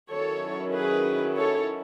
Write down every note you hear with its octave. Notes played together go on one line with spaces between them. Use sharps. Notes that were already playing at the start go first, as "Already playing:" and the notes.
D#3 F#3 C#4 E4 A4 C#5
G#4 B4
A4 C#5